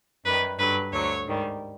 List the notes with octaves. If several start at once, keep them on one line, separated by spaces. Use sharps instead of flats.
F#2 D#3 G3 B4
G2 D3 F#3 B4
D2 D3 F#3 C#5
G#2 D#3 G3